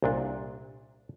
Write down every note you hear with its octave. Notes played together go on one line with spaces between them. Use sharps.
C2 A#2 D4